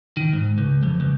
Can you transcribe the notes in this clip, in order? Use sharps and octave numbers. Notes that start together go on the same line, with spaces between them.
D#3
G#2
C#2
F2
C#2